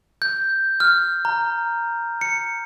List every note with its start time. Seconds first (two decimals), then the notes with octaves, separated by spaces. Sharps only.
0.22 G6
0.80 F6
1.25 A#5
2.21 C#7